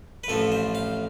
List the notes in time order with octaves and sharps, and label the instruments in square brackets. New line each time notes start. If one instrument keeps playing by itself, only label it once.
[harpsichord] B4
A1 A2 F3 C4 A4
C5
F5